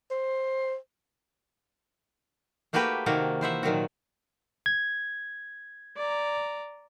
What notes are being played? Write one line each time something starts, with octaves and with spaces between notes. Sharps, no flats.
C5
A3 A#3 F#4 G4 B4 G5
C3 D#3 A#3 F#4 A5
E3 C5 E5 F#5
A#2 D#3 F#3 F#4
G#6
D5 A#5